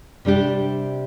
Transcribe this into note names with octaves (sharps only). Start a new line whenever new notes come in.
C3 G3 D4 G4